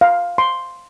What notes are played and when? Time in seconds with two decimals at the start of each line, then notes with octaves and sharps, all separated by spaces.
0.01 F5
0.38 C6